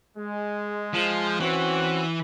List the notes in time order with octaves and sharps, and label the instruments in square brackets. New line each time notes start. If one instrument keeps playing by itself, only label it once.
[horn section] G#3
[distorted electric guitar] F3
[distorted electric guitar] E3 [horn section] C4 C#4 F#4